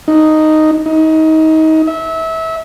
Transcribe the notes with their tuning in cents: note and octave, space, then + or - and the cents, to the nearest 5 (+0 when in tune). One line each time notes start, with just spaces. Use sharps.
D#4 -5
D#4 +25
E5 -25